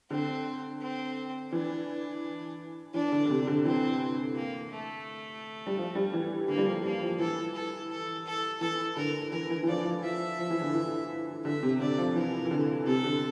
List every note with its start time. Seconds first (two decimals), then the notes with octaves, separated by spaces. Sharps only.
0.10 D3 C4
0.81 C4
1.52 E3 D4
2.94 E3 D4
3.12 D3
3.25 D3
3.30 C3
3.47 D3
3.65 E3 C4
4.35 A#3
4.71 A3
5.67 G3
5.77 F3
5.95 G3
6.13 E3
6.48 D3 A#3
6.58 G3
6.66 F3
6.83 G3 A#3
7.02 F3
7.19 E3 A4
7.54 A4
7.91 A4
8.26 A4
8.61 E3 A4
8.97 D3 A#4
9.32 E3 A#4
9.50 E3
9.63 E3
9.67 F3 D5
9.85 F3
10.03 F3 E5
10.39 F3
10.50 E3
10.62 D3
10.74 E3
11.44 D3 E5
11.63 C3
11.80 D3 D5
11.98 F3
12.16 E3 A#4
12.45 E3
12.51 D3
12.86 C3 A4
13.04 D3